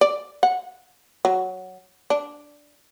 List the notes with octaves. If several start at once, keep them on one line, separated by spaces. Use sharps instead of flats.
D5
F#5
F#3
D4